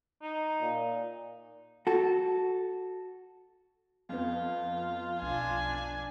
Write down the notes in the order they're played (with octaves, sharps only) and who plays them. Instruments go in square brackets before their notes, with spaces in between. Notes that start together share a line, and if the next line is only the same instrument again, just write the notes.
[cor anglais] D#4
[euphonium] A#2
[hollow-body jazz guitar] F#4 A4
[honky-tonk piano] F2 B3 [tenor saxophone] F4
[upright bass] B1 [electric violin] D4 G#5